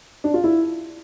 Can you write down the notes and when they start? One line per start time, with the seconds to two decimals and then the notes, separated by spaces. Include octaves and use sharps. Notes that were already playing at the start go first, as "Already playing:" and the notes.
0.24 D4
0.34 F4
0.44 E4